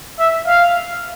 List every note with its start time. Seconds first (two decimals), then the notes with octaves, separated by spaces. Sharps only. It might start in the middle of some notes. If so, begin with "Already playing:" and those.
0.19 E5
0.47 F5